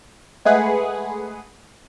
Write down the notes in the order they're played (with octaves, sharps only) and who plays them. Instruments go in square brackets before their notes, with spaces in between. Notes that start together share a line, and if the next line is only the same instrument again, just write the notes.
[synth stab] G#3 A3 G#4 B4 F#5